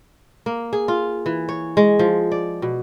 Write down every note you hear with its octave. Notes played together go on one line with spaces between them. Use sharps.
A#3
G#4
F4
E3
C#5
G#3
F3
D5
B2